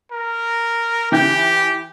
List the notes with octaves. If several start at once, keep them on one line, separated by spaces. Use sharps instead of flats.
A#4
E3 G4 G5 G6